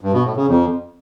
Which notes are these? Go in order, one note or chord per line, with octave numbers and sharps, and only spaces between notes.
G2
B2
A2
C#3
F2